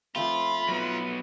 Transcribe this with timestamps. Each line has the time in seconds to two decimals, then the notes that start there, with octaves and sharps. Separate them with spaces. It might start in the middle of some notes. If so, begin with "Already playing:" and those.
0.16 F3 A3 C4 F4 B5
0.69 F#3 B3